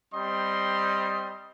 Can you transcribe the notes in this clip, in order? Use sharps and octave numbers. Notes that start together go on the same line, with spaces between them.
G3 C4 D#5 C6